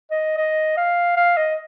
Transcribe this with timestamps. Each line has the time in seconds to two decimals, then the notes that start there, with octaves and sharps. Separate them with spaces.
0.11 D#5
0.37 D#5
0.77 F5
1.17 F5
1.37 D#5